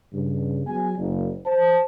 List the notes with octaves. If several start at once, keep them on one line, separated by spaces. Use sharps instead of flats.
G2 C#3
F#3 B3 G#4 G#5
F#1
C5 A5